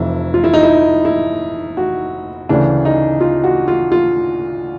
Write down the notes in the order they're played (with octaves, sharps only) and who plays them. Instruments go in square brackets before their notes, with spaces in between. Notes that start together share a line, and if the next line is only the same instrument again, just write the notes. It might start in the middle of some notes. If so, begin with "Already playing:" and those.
Already playing: [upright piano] F1 F2 C3 E3 E4
F4
E4
D#4
E4
E4
F#4
D2 C#3 E3 D4
D#4
F4
F#4
F4
F4